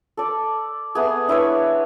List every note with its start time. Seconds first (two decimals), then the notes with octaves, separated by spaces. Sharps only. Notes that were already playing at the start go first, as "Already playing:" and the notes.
0.17 A4 D5
0.95 A3 B3 G#4
1.28 D4 E4 B4 C#5